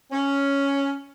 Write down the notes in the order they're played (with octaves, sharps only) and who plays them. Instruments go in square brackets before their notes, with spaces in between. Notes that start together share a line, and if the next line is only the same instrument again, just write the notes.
[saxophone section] C#4